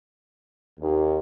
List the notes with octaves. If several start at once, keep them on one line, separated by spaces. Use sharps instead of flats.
D#2